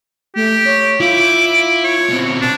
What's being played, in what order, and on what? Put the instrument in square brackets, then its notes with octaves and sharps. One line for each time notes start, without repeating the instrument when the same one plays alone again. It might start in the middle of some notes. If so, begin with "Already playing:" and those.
[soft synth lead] A3 [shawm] G4
[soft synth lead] C#5
[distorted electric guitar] E4 [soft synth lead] F4 [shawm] D6
[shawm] C#5
[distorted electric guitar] B2 C4
[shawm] D4